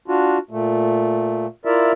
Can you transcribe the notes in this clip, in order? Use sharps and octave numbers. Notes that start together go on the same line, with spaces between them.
D4 F4 F#4
A#2 A3
E4 F4 A#4 D5 E5